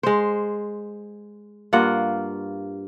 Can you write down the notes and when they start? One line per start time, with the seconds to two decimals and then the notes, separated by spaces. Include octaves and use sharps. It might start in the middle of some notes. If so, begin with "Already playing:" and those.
0.03 G#3 C5
1.73 G2 A#3 F4 F#5